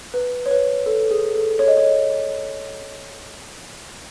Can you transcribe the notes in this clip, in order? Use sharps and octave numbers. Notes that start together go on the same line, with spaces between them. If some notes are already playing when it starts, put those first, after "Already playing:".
B4
C#5
B4
A4
G#4
A4
C#5
D#5
C#5